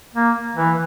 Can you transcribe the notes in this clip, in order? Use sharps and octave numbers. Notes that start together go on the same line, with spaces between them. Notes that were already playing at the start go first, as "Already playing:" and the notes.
A#3
E3